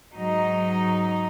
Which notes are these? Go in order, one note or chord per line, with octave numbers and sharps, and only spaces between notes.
G#2 F#3 D#4